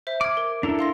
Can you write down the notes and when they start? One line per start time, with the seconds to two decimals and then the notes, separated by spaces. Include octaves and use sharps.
0.07 C5 E5
0.21 D6 F6 G#6
0.37 A#4
0.63 D4 E4 A4 A#5
0.79 F5 C6 A#6